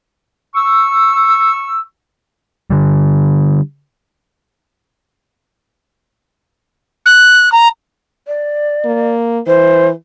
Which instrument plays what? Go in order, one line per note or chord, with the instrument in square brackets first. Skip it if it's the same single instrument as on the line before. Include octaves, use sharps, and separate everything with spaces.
[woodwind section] C#6 E6
[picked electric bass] D3 G3
[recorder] F#6
A#5
[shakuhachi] D5
[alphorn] A#3
[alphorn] E3 [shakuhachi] C5